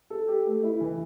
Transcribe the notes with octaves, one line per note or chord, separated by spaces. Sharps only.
A4
G4
A3
E4
E3